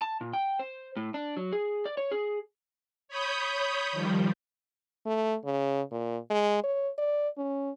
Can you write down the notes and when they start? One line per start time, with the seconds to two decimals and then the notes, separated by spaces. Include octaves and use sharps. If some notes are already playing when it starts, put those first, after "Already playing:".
0.02 A5
0.21 A#2
0.33 G5
0.59 C5
0.96 A2
1.14 D4
1.37 F#3
1.53 G#4
1.85 D5
1.97 C#5
2.11 G#4
3.08 C#5 B5 D#6 G6
3.92 D#3 F3 G3
5.06 A3
5.45 C#3
5.91 A#2
6.30 G#3
6.63 C#5
6.98 D5
7.38 C#4